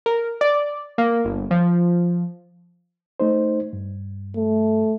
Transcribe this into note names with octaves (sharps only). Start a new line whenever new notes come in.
A#4
D5
A#3
G1
F3
A3 D#4 C5
G2
A3